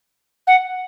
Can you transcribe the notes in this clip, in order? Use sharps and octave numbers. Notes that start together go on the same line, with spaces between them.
F#5